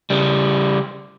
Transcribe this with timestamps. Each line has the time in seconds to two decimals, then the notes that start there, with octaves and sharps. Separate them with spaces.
0.10 C#3 G3